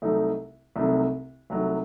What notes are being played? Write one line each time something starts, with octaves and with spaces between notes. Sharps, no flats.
C2 C3 F#3 A3 D#4
C2 C3 F#3 A3 D#4
C2 C3 F#3 A3 D#4